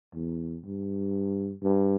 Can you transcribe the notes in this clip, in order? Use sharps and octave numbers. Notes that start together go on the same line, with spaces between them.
E2
G2
G2